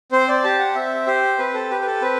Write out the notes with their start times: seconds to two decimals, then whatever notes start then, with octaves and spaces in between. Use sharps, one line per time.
0.12 C4 C5
0.28 D5
0.44 G4 A5
0.59 F#5
0.75 C4 E5
1.07 G4 C5
1.38 C4 B4
1.54 A4
1.70 G4 B4
1.81 B4
1.86 A4
2.02 C4 B4